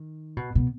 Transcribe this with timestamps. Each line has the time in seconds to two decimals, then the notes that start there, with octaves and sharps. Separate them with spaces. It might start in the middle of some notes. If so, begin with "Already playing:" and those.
Already playing: D#3
0.37 B2
0.55 B2